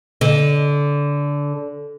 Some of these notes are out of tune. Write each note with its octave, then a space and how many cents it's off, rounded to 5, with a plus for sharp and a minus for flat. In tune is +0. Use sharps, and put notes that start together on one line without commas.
D3 -20